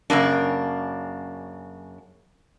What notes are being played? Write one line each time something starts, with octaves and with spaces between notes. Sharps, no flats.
F#2 C#3 A#3 D4